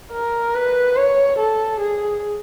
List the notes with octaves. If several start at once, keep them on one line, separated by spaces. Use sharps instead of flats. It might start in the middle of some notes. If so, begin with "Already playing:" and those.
A#4
B4
C#5
A4
G#4